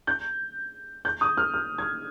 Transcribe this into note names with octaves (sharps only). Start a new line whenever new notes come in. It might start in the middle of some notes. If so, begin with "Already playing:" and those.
G6
G6
D#6
F6
F6
G#6